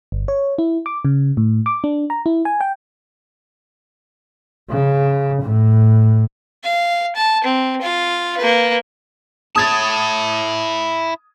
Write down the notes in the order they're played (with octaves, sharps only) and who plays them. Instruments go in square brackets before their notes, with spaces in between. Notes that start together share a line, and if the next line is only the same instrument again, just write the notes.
[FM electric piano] G1
C#5
E4
D6
C#3
A2
D6
D4
A#5
E4
G#5
G5
[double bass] C#3
A2
[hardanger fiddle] F5
A5
C4
F4 F5
A#3 B4
[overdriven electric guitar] E4 A5 [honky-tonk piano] D#6 G#6 A6